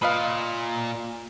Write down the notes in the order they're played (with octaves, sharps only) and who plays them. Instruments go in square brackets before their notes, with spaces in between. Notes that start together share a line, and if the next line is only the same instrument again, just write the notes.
[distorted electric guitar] A#2 [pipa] B4 D#5 F5